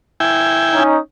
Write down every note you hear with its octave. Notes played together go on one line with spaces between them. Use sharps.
E4 G5 G#5
C#4 D#4